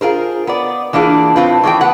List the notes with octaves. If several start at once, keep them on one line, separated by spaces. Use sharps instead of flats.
F4 G#4 A#4 C5
B3 D5
E3 A#3 D4 F4 G#4
A2 C4 F4 B4
D#3 E3 A3 B4 G5
B3 F#5